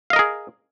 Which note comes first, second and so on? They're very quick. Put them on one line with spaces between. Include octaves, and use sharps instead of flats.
F5 D#5 A#4 G#4